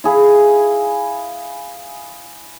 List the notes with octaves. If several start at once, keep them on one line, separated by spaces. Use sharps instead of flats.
E4 G#4 F5